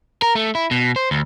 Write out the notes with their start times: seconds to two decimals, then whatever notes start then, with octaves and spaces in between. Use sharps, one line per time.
0.22 A#4
0.35 A3
0.55 E4
0.71 B2
0.96 C5
1.11 D2